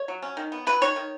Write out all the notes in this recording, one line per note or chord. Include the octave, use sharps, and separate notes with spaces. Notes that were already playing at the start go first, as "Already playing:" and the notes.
Already playing: C#5
F#3
C#4
D#3
B3
F#3 B4
D#3 C#5
D#3